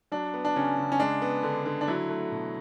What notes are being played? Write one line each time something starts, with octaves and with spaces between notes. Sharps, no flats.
F#3 D4
B3
D4
C#3 C#4
C#3
C#4
G#3 D4
B3
D3
D3
D4
F#3 E4
A3
B2